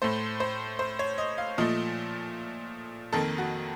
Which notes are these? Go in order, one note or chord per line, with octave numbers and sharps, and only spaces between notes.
A2 A3 C5
C5
C5
C#5
D#5
F5
A#2 F3 A3 D#5
F2 D#3 A#3 A4
F#4